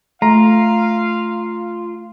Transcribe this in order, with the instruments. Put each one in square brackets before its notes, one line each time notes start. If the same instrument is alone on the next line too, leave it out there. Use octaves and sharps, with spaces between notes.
[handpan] A3 [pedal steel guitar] F4 [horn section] F5 [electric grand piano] A#5